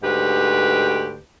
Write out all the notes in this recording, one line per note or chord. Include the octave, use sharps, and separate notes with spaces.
D2 G#2 G4 B4